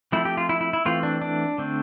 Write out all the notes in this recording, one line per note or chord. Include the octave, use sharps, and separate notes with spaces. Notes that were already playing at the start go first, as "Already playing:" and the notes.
F3 A3 C4 E4
G4
F4
E4
E4
E4
E3 A3 C4 F4
D4
D4
D3 A3 C4